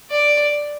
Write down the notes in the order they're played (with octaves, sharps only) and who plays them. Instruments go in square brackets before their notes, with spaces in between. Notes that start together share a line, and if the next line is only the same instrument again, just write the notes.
[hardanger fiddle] D5